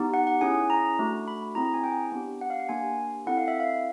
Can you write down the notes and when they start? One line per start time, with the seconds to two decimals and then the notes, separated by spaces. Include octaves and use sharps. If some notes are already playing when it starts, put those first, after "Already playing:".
Already playing: B3 D#4 G4
0.14 F#5
0.27 F#5
0.41 C#4 E4 G#4 G#5
0.70 A#5
0.99 A3 D4 F#4
1.28 B5
1.55 C4 E4 G#4 A#5
1.65 A#5
1.74 G#5
1.84 G5
2.12 B3 D4 G4
2.41 F#5
2.50 F5
2.60 F#5
2.69 A#3 D4 G4 G#5
3.26 C4 E4 A4 F#5
3.37 F5
3.48 E5
3.60 F5